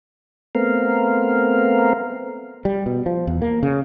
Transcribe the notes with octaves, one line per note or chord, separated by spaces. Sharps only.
A3 B3 C4 A#4 F5
G3
B2
F3
E2
A#3
C#3